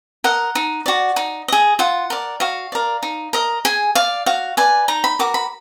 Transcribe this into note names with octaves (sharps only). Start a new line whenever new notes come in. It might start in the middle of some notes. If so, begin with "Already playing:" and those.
A#4 D#5 F#5
D#4
F#4 D5
D#4
G#4 D#5
F4 F#5
A#4 D5
F#4 F5
A#4 D5
D#4
A#4 D#5
G#4 G#5
D5 F5
F#4 F5
B4 D5 G#5
D#4 A#5
B5
F#4 A#4 D6
B5